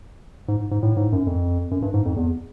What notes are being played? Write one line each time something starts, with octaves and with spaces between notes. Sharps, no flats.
G#2
G#2
A2
G#2
F#2
F2
F#2
G2
G#2
F2
E2